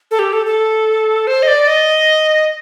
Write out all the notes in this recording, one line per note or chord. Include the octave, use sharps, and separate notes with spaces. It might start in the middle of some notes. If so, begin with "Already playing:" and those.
A4
G4
A4
A4
C5
D#5
D5
D#5